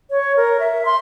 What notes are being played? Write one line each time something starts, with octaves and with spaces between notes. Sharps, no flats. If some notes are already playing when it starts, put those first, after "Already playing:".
C#5
A#4
E5
C6